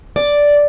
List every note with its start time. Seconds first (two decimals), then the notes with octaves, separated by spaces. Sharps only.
0.16 D5